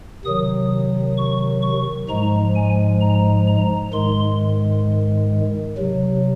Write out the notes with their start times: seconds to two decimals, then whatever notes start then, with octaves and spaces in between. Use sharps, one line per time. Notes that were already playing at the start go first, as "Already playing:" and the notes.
0.25 C3 D#3 F#3 D#6
1.17 C#6
1.62 C#6
2.09 G#2 F3 G#3 A#5
2.55 G#5
3.01 A#5
3.48 A#5
3.93 G#2 D#3 G#3 C6
5.77 C3 F#3